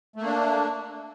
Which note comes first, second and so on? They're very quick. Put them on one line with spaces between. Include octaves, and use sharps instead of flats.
A3 A#3 D4